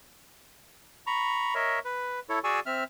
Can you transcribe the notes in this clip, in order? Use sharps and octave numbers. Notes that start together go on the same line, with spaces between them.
A#5 B5 C#6
A#4 C#5 D#5 E5
B4
E4 A4 C#5
F#4 G#4 D5 G#5 C#6 E6
C4 E5 F6